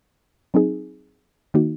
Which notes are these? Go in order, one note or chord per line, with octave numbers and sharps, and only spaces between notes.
F#3 C4 D#4 G#4
D#3 A#3 D#4 F#4